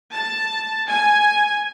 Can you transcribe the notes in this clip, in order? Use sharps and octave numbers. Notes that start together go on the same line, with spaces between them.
A5
G#5